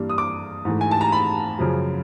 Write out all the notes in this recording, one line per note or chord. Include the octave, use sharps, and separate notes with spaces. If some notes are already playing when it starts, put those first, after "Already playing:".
Already playing: G2 E3 G3 A#3 D4
D#6
D6
G#2 E3 A3
G#5
A5
A#5
B5
F#2 C#3 F3